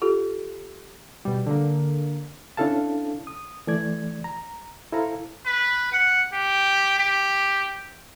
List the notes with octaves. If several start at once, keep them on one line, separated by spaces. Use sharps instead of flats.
F4 G4 A4
B2 G3
D3 A#3
C#4 D4 E4 A4 F5 A5
D#6
E3 A3 D5 G#6
A#5
E4 A4 C5 F5 A#5
B4
F#5
G4
G4